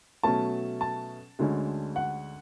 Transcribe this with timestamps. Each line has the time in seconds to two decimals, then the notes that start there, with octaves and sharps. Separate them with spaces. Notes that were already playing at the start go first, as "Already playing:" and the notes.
0.23 B2 F#3 A3 C#4 A5
0.81 A5
1.39 D2 D3 G#3 C#4
1.96 F#5